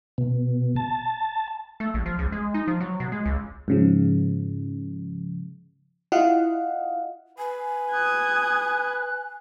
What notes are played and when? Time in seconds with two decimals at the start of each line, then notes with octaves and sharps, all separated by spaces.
0.18 B2
0.76 A5
1.80 A3
1.94 A#1
2.06 F3
2.19 C#2
2.32 G#3
2.54 D#4
2.68 F3
2.81 F#3
3.00 B2
3.12 G#3
3.26 C#2
3.68 G#2 C#3 F3
6.12 E4 F4 D#5 F5 F#5
7.38 B4 G#5
7.91 D#6 F#6 G#6